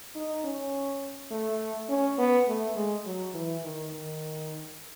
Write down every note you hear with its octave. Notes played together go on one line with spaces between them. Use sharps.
D#4
C#4
A3
C#4
B3
A3
G#3
F#3
E3
D#3
D#3